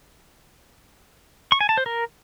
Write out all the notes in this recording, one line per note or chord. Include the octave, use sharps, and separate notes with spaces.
C#6
G#5
A5
C5
A#4